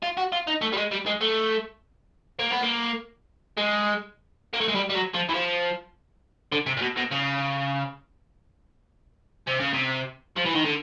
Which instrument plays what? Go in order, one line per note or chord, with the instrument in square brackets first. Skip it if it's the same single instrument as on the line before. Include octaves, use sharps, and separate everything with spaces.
[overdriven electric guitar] F4
F#4
F4
D#4
A3
G3
G#3
G3
G#3
A3
A#3
B3
A#3
G#3
A#3
A3
G#3
G3
G3
F#3
F3
E3
F3
D3
C3
A#2
B2
B2
C#3
C3
C#3
C3
F3
E3
D#3
D3